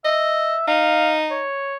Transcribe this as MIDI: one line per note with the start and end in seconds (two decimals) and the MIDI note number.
0.04 0.56 75
0.04 0.65 76
0.68 1.45 63
0.68 1.14 77
1.30 1.77 73